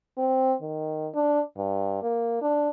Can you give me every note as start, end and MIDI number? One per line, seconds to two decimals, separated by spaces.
0.18 0.54 60
0.61 1.08 51
1.14 1.41 62
1.57 1.99 43
2.02 2.38 58
2.41 2.69 62